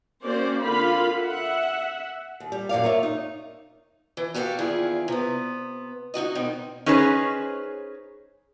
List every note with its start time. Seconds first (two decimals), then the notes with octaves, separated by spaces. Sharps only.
0.24 A#3 C4 C#4 F#4 C5 D5
0.62 D3 F4 A#4 F5 B5
1.18 E5 F#5
2.40 D#2
2.52 G3
2.69 F#2 A#2 D5 F5
2.84 F4 A#4 C#5 E5
3.03 D#4
4.17 E3
4.34 F#4 G4 A4 E5 F5
4.59 E2 D#3 E4 F4 G#4 D5
5.08 C3 B3
6.14 D#4 E4 F#4 D#5
6.35 B2 D#3 C4 D#4
6.86 C#4 D#4 G#4 B4 C5